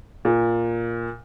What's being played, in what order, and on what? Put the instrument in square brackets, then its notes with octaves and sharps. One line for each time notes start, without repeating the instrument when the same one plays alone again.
[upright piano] A#2